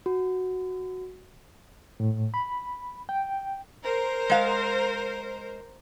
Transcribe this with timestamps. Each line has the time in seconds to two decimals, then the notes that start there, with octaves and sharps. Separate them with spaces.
0.06 F#4
2.00 A2
2.34 B5
3.09 G5
3.84 A#4 C5
4.30 G#3 F5